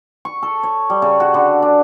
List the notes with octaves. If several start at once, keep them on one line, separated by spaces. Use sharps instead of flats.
C#6
A4
C#5
G3
C#3
F#4
D3
D4